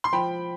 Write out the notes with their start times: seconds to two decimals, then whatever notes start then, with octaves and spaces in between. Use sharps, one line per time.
0.04 C6
0.13 F3 G5 B5